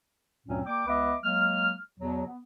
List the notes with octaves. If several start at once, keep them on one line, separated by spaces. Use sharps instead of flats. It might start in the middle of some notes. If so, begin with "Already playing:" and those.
D2 G2 A#2 F#3 C4 C#4
A#3 D5 G5 D6
C#2 B3 B4 D#5 E5 D6
F#3 G#3 A#3 F6
E2 B2 F#3
B3